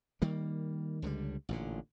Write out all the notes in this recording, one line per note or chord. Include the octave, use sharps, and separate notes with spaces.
D#3 G3 A#3
C#2 D3 D#3 G3
A1 A#2 D3